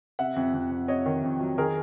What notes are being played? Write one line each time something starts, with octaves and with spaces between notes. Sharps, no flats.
C3 E5 F#5
F2
F2
F2
C3 C#5 D#5
D#3
F2
F#3
D#3 G#4 A#4